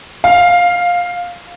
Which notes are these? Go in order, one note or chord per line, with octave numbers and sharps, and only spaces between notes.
F5